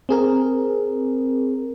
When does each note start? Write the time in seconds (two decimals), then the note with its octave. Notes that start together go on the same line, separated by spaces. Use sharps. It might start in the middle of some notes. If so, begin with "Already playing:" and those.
0.09 C4 G#4 A#4